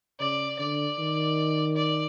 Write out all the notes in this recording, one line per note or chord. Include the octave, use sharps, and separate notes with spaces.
C#3 D5
D3 D5
D#3
D5